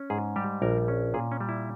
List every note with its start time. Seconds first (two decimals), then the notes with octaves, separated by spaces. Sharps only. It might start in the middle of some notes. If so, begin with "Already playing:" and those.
Already playing: C#4
0.10 G#2 G#4
0.36 G3 G4
0.62 A#1 A#4
0.88 C#4
1.14 A#2 G#4
1.32 C#4
1.40 G3
1.49 E4